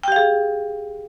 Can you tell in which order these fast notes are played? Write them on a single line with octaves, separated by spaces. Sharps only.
G5 G4 F5 G#4